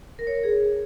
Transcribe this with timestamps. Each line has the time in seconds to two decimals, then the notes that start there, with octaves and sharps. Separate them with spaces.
0.19 A#4
0.27 C#5
0.35 A#4
0.43 G#4